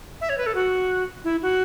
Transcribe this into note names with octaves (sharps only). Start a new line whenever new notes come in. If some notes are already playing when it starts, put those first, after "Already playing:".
E5
C#5
B4
A4
F#4
E4
F#4